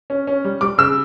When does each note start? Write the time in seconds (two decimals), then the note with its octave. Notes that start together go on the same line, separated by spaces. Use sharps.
0.10 C#4
0.27 C#4
0.45 G3
0.61 G3 D6
0.78 C#3 E6